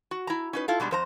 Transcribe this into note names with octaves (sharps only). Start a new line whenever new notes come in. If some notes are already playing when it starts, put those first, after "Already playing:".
F#4
E4 A#5
C#4 D#4 B4
E4 F4 A4
B2 G3 G#3 D4
F2 C5 A#5